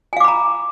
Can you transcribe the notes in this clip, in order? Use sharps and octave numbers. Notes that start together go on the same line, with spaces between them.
F5 G#5 A#5 B5 D6